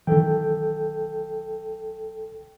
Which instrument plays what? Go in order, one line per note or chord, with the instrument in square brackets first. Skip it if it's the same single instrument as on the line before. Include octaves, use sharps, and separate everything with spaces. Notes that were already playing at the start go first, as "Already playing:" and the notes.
[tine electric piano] B1 A4 G5 [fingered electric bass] D#3 E3